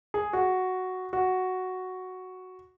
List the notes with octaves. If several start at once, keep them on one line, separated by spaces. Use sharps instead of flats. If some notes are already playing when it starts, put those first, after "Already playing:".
G#4
F#4
F#4